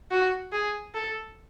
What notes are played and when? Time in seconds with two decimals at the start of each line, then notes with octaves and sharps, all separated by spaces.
0.11 F#4
0.52 G#4
0.94 A4